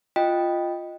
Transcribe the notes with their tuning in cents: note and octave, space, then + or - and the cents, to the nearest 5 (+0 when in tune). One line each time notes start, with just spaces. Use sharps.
F4 +0 D#5 +0 G5 +0